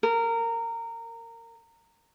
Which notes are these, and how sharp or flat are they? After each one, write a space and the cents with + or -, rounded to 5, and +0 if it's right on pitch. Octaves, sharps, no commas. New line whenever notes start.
A#4 -20